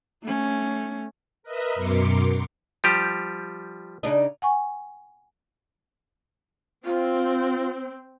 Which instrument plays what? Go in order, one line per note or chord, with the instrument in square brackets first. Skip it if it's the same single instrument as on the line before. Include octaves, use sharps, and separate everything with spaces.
[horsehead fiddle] A3 C#4
[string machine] A#4 B4 D#5 E5
F#2 B2 A#4 C6 D6 C#7
[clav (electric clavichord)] F3 G3 G4
[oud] C#3 D4 D#4
[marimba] F#5 G#5 C#6
[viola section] C4 [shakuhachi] F4